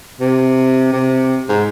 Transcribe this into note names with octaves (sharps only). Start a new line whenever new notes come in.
C3
C3
G#2